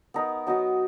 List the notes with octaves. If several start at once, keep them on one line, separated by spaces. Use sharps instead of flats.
B3 D#4 A#4
F#3 B3 D#4 F#4